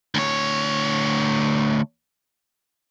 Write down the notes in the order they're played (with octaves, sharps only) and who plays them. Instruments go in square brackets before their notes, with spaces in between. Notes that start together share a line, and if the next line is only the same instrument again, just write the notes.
[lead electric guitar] D2 C#5